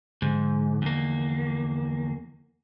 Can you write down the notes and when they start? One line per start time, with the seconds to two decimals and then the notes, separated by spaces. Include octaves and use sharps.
0.22 G#2 D3 F3 G#3
0.82 E2 A#3